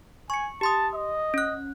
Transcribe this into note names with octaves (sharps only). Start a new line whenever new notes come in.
G#5 C#6 C#7
G4 A5 C6 D#6
D#5
C#4 F#6